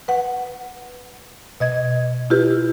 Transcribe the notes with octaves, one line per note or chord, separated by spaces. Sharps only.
B4 F#5
B2 D#5 G#6
E4 F4 G4 B4